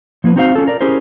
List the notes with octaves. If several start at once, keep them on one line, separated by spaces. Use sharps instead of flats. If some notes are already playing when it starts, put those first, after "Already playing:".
F3 A#3 E4 B4
C4 D#4 F#4 C5 F5
C#4 F4 A4
A#4 D5
C#4 E4 G4 G#4 A#4 C5